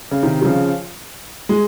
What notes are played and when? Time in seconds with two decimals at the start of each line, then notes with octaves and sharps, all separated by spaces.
0.11 C#3
0.23 C3 D#3
0.41 G3
0.45 C#3 F3
1.49 G#3